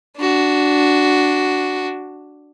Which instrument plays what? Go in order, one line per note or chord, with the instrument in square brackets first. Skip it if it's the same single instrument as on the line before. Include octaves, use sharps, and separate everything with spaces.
[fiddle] D4 F#4